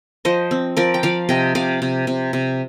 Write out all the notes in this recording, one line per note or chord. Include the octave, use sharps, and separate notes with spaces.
F3 C5 D#5
C4
F3 A#4 D5
G5
F3 D5 F5
C3 D#5 G5
C3 D5 F5
C3
C3
C3